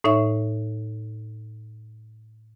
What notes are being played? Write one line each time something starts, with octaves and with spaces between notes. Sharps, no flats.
A2 D#4 C#5 E5